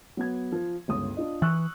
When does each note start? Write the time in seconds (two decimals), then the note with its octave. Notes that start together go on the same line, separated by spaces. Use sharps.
0.17 F#3 B3 G#6
0.52 F3
0.88 G1 C#2 D#6
1.17 D4 F4 D#5
1.42 E3 C#6 E6 F#6